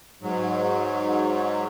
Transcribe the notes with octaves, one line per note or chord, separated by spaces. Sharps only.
G#2 F#3